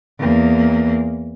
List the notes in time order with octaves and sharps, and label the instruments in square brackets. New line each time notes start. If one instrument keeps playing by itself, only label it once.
[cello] E2 A#3